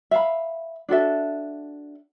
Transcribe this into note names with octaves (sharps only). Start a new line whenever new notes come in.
E5 F5 B5
D4 F#4 A4 E5